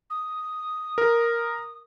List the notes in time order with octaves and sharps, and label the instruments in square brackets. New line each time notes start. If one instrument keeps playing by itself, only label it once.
[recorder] D#6
[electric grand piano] A#4